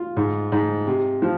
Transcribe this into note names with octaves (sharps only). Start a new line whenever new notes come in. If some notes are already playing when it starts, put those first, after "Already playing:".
Already playing: F4
G#2
G#2
C3
F3